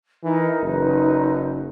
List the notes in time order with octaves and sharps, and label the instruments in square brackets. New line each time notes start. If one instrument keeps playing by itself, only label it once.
[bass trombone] E3 [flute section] D#4 A#4
[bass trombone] F#1 [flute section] D#4 B4